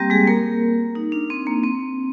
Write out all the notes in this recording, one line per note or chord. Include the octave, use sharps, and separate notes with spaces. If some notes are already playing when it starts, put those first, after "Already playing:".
Already playing: G3 A#3 C4 G4
G#3 G#4
A#3 A#4
D#4
D4
C4
A#3
C4